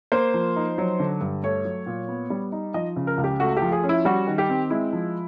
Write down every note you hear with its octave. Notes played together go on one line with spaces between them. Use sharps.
A#3 C5
F3
D#4
F#3
D3
G2
A3 C#5
F#3
A#2
B3
G3
D#4
F3 D#5
C#3
A#4
C#2
G4
A3 F#4
G4
F3
G#4
C#4
E4
G3 F#4
D#3
G4
C4
G#3 E4
F3